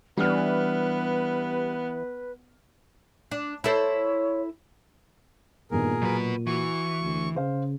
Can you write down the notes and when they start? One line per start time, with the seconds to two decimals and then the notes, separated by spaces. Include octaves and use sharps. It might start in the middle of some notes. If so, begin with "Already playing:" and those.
0.17 E3 G3 B3 D4 B4 F6
3.31 D4
3.64 E4 A4 C5 C#5
5.71 G2 A#2 D#3 B3 G#4 A#4
6.02 B2 F#3 B4 A#5
6.47 E3 F#4 C#6
7.01 D2
7.35 C#3 G#4 C5 F5